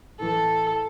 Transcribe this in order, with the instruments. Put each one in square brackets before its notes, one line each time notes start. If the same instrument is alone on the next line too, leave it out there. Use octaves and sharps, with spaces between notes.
[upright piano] A2 E3 [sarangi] A4